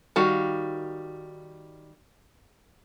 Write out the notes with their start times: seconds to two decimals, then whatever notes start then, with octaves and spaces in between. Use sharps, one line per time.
0.16 D#3 G3 F#4 F5